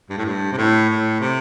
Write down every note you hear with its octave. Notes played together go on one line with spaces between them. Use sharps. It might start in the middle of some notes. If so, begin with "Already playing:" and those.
G2
A2
G2
C3
A2
A2
C3